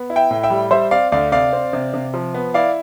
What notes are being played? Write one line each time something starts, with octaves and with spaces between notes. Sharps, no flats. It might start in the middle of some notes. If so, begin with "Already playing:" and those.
Already playing: B3
E4
E5 G5
A2
E5 G5
G3
G3 C5 E5
C4 D5 F5
D2 D5 F5
C3 D5 F5
C4
C3
C3
F3
B3
E4 D5 F5